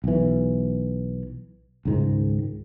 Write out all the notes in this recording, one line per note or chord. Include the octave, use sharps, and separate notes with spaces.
B1 E3
C#2 G#2 D#3